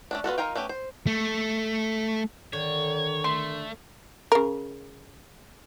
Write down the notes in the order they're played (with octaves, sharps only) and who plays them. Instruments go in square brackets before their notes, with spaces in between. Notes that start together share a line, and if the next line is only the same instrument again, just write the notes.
[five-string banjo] A3 C#4 D4
B3 F4 F#4 A4
D#4 F4 A#4 F5 G5
A3 B3 C#4 G4
C5
[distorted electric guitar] A3
[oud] D3 [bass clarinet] D#3 [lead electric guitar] C#5
[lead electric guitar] A3 [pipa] C6
[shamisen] C#3 A#4